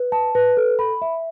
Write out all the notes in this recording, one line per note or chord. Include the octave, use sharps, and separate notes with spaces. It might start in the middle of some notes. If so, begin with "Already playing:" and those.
Already playing: B4
A5
B4
A4
B5
E5